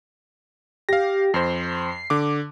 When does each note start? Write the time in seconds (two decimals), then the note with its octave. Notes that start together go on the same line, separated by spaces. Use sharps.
0.89 G4 F5 A#6
1.34 F2 C5 C7
2.10 D3 D6